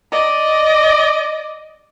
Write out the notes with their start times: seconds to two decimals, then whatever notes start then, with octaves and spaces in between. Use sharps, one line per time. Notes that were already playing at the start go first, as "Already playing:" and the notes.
0.11 D5 D#5